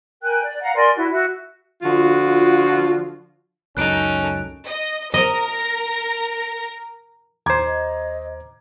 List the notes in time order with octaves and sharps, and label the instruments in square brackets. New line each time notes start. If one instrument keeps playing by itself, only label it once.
[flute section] A#4 G5 G#5 F#6
D5
F5 F#5 A#5
A#4 D5 G#5 C6
E4 F#4
F#4 E5
[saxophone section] D3 F3 F4 F#4
[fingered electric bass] C#2 F#2 [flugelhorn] C#4 [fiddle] D#4 A4 [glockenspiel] F#6 D7
[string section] D#5
[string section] A#4 A#6 [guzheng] D#5
[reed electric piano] D#2 C5 [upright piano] A#5 D6 G#6
[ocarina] D#5